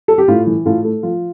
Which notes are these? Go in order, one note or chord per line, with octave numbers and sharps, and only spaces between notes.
A4
G4
A2 F4
E3
A2 F4 A4
A3
F3 F4